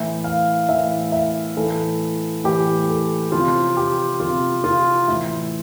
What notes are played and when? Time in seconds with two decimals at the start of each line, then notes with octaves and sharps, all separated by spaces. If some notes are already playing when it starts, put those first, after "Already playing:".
Already playing: A2 E3 E5
0.24 F5
0.68 A2 E3 E5
1.12 E5
1.57 A2 E3 A4
2.44 A2 E3 G4
2.89 A4
3.32 C3 F3 F4
3.77 G4
4.20 C3 F3 F4
4.64 F4
5.08 A2 E3 E4